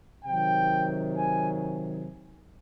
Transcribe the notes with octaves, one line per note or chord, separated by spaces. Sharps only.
C3 D#3 F#3 G5
G#5